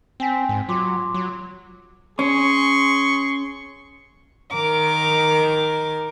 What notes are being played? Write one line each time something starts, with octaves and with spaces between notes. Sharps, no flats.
C4 G5 G#5 B6
G#2
F#3 F4 C6 D6
F#3
C#4 G#4 C6 C#6
D#3 A#4 D6